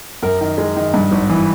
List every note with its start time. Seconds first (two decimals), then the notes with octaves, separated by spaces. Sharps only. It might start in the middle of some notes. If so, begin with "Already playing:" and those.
0.23 F#2 A#4
0.41 D#3
0.58 G#3
0.76 D#3
0.94 G2
1.12 G#1
1.30 E3